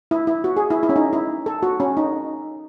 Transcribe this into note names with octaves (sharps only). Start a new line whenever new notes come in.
E4
E4
F#4
G#4
E4
E4
C#4
D#4
E4
A4
F#4
C#4
D#4